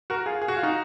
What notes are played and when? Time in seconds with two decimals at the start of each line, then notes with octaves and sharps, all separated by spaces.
0.10 F#4 A#4
0.26 F4 G#4
0.42 G#4
0.48 F#4
0.57 F4
0.63 D#4 F#4